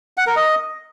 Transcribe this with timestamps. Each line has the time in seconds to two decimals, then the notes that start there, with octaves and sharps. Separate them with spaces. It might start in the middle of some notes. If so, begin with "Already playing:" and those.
0.17 F#5
0.27 A#4
0.36 D#5